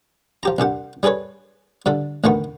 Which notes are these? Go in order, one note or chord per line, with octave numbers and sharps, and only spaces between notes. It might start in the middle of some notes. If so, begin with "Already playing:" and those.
F3 G4 A#5
C2 G2 G4 F#5
G3 G#4 A4 B4 C#5
G2 D3 A4
A1 D2 D#3 A3 B3 C#6